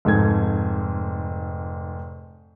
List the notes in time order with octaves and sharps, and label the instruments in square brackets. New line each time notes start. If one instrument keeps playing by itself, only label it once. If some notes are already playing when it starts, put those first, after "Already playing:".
[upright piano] F1 G#2 A4 G#6